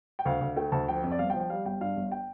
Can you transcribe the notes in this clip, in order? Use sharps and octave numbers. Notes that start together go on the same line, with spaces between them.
G5
D2 F5
D2
A3 G5
D2 A5
F3 G5
F2
D5
G1 F5
G5
F3
G5
G3 F5
G1 G5
G2 F5
G1
G5